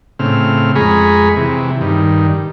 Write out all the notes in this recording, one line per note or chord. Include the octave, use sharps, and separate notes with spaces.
A2 C#3 C4 F6
F2 G#3 G#4 A#5 B5 C#6
C3 E3
G2 D#3